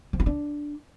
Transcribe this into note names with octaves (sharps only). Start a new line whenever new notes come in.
F3
F4
D4